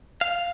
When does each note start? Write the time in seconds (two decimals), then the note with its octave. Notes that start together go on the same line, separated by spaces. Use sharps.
0.21 F5